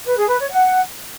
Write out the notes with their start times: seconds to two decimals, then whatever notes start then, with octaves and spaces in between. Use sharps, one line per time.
0.05 B4
0.16 G#4
0.28 B4
0.39 C#5
0.50 F#5